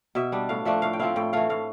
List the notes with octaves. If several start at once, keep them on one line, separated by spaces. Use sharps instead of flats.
B2 E5
G3 D4
A2 F5
F3 A3 D4 E5
A2 F5
G5
F3 C4 E4 F5
A2 G5
E3 A3 F5
A2 F5